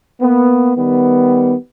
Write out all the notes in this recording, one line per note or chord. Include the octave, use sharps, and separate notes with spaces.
A#3 B3
D#3 G3 B3